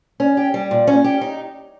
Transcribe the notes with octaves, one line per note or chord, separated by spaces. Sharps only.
C#4
G4
G3
A#2
C#4
G4
D#4